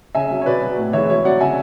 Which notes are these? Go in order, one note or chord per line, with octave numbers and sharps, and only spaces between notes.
C#3 E5 G#5
F#3
C#5
B2 B4 D5
F#3
A2
E3 G#3 C#5 E5
B2 C#5
F#3 D5 F#5
C#3 E5 G#5